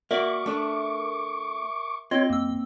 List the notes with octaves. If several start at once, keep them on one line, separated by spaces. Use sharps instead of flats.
A#3 F#4 A#4 D5 E5 C#6 D6
A3 D4
C4 F4 C#5 D#5
F#2 A#3 E6